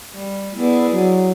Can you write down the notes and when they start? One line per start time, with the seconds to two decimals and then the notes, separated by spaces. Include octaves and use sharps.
0.14 G3
0.56 B3 E4 G#4 D5
0.90 F#3